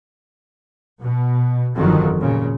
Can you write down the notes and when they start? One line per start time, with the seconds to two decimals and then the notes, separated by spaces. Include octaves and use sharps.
1.01 B2
1.75 G1 F2 D#3 F#3
2.19 A#2 C#3